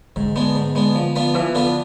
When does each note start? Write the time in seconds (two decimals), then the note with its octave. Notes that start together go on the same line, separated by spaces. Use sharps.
0.16 G#2 D3
0.36 G#3 B3 D4
0.55 G#2
0.75 G#3 B3 D4
0.95 F3
1.16 B3 D4 F4 B4
1.34 E3 F3
1.55 D3 B3 D4 F4 B4